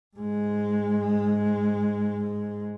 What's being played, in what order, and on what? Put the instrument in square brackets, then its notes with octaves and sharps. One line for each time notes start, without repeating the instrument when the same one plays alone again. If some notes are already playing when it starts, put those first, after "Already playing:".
[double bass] G#2 G#3